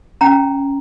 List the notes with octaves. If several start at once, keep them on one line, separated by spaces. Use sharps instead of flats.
C#4 G5 A#5